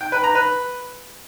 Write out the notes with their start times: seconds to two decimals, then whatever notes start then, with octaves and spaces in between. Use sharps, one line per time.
0.01 G5
0.12 B4
0.24 A#5
0.35 B4